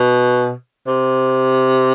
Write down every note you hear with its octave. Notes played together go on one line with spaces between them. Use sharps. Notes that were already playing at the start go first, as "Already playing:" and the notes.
Already playing: B2
C3